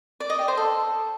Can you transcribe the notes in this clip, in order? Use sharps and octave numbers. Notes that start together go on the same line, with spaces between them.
D5
D#5
G4
C5
A4